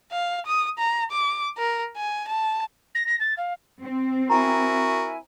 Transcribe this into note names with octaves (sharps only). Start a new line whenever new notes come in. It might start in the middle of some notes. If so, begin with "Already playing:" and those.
F5
D#6
A#5
D6
A#4
G#5
A5
A#6
A#6
A6
F5
C4
E4 F#4 A#4 G5 G#5 A#5